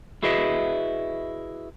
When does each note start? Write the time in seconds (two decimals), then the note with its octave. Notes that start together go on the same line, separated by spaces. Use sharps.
0.23 E4 F#4 G#4 B4 D#5 E5